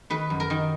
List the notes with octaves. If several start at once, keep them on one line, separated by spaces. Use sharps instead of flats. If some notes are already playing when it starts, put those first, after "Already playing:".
D#3 B4
F#2
A#4
D#3